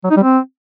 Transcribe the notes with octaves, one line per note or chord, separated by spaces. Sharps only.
F#3
D#4
G3
C4